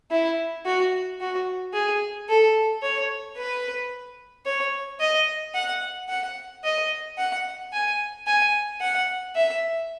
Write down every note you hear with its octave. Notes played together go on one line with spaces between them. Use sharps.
E4
F#4
F#4
G#4
A4
C#5
B4
C#5
D#5
F#5
F#5
D#5
F#5
G#5
G#5
F#5
E5